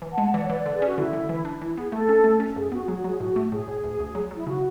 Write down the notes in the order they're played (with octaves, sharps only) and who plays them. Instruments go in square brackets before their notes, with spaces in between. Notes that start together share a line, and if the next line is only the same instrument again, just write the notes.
[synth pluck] E3
[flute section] F#5 A5
[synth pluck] G#3
[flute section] F#5 A5
[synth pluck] E3 [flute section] D5 F#5
[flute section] C#5
[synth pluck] E3 [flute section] B4 D5
[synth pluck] D3
[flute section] G#4
[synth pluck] C#4 [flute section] F#4
[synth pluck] D3 [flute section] E4
[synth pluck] D3
E3
D4
[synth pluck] E3 [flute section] E4
[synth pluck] B3 [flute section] G#4
[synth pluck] A3 [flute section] A4
[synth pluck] C#4
A3
C#4
[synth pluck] F#2 [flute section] G#4
[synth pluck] B3 [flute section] F#4
[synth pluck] F#3 [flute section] G#4
[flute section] F#4
[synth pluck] F#3 [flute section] G#4
[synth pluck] A2 [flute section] F#4
[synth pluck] A3
[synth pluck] A2 [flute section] G#4
[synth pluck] A2
D2
D2
F#3
[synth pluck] F#3 [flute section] E4
[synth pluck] C#3 [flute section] F#4